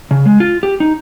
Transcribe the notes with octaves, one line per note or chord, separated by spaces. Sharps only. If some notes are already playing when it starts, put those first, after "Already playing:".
C#3
G#3
F4
G4
D#4